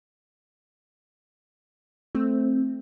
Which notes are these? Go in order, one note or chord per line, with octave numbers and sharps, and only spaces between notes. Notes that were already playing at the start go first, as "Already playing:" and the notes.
A3 C4